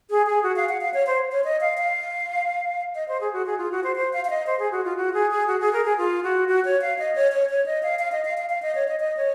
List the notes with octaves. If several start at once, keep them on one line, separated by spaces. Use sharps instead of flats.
G#4
G#4
F#4
F5
F#5
F5
C#5
C5
C#5
D#5
F5
F5
D#5
C5
G#4
F#4
G#4
F4
F#4
C5
C5
F5
F5
D#5
C5
G#4
F#4
F4
F#4
G#4
G#4
F#4
G#4
A#4
G#4
F4
F#4
F#4
C#5
F5
D#5
C#5
C#5
C#5
D#5
F5
F5
D#5
F5
F5
F5
D#5
C#5
D#5
D#5
C#5